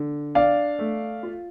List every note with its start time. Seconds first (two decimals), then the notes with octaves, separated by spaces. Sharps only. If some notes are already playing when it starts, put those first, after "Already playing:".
Already playing: D3
0.35 D4 D5 F5
0.79 A3
1.23 F4